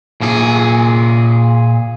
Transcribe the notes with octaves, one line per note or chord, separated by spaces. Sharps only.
A#2 G#4